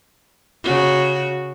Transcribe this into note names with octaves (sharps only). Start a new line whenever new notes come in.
C#3 F#4